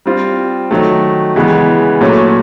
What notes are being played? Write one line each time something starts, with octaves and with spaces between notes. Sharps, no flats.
G3 C4 F4
D#3 F#3 A3
C#3 E3 G#3 B3
A#2 F#3 A3 C#4